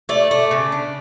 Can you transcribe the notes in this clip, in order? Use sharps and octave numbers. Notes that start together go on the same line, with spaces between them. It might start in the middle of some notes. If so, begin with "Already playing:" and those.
A3 D5
A3
C#3
D4